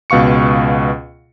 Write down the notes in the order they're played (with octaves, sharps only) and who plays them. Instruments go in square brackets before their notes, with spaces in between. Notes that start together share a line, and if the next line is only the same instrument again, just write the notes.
[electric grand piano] C#2 B2 F5 C#6 C#7